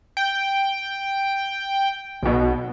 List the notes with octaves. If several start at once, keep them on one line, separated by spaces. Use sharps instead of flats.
G5
B1 B2